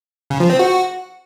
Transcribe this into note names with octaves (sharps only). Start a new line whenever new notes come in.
C#3
F3
C4
F#4